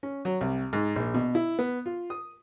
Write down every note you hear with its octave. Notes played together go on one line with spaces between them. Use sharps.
C#4
F#3
C2
G#2
A#1
B2
E4
B3
F4
D#6